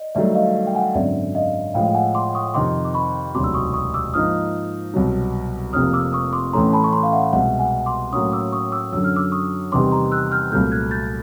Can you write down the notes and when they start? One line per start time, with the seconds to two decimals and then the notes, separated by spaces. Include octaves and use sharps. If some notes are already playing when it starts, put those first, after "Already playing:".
Already playing: D5 D#5
0.15 G2 D#3 F#3 A3 D5 E5
0.35 D#5 F5
0.67 G5
0.75 F#5 G#5
0.95 G#1 F#2 D3 D5 E5
1.35 D#5 F5
1.74 A2 F3 G#3 F5 G5
1.94 F#5 G#5
2.15 C6 D6
2.35 C#6 D#6
2.54 F2 C3 D#3 C6 D6
2.85 D6
2.94 B5 C#6
3.34 E1 D2 C3 D#3 F#3 C6 D6
3.44 E6
3.54 C#6 D#6
3.74 C#6 D#6
3.94 D6 E6
4.14 G#2 F3 A#3 D#4 D#6 F6
4.94 C2 B2 F#3
5.73 F1 F2 C3 F3 A#3 D#6 F6
5.94 D6 E6
6.13 C#6 D#6
6.33 C6 D6
6.53 A1 A2 E3 A3 C#4 A#5 C6
6.73 A5 B5
6.84 C#6
6.93 A#5 C6
7.03 F5
7.13 E5 F#5
7.33 C2 B2 G#3 E5 F#5
7.59 F#5 G#5
7.86 C6 D6
8.13 A2 F#3 A#3 C#4 C#6 D#6
8.32 D6 E6
8.52 C#6 D#6
8.72 D6 E6
8.93 F#2 D3 F#3 E6
9.04 F6
9.16 D6 E6
9.32 C#6 D#6
9.72 E2 C3 D#3 G3 C6 D6
9.92 A#5 C6
10.12 E6 F#6
10.32 F6 G6
10.52 C2 A#2 F#3 A3 F6 G6
10.72 F#6 G#6
10.91 G6 A6